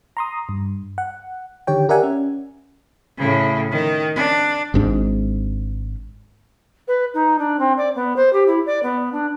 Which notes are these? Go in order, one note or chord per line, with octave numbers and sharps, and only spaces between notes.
A#5 C6 D#6
G2
F#5
D3 D#3 G4 C#5 G5
G4 A#4 D5 E5 F#5 G#5
C#4
A2 C#3
D#3
D4
G#1 G#2 D4
B4
D#4
D4
C4
D5
B3
C5
G4
E4
D5
B3
D4